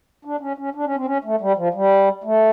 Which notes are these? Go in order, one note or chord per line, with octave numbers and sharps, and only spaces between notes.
D4
C#4
C#4
D4
C#4
C4
C#4
A3
G3
F3
G3
A3